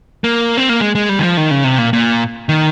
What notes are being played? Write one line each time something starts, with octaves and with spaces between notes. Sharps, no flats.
A#3
C4
A#3
G#3
G#3
G3
D#3
F3
D#3
C#3
C3
A#2
A#2
D#3